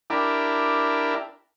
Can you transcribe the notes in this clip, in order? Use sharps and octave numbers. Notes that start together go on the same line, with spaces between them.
D4 E4 G4 A#4